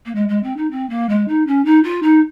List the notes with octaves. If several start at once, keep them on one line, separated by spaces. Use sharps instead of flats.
A#3
G#3
G#3
C4
D#4
C4
A#3
G#3
D#4
C#4
D#4
F4
D#4